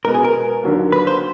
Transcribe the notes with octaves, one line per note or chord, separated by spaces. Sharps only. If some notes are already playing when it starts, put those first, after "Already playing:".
B2 G#3 B3 A#4
G#4
A#4
D#2 D3 F#3 A#3
B4
C5